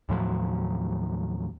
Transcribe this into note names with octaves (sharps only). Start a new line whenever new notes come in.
D#2 A2 F3 F#3